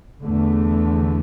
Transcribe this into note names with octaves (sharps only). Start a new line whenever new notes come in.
E2 D3 A3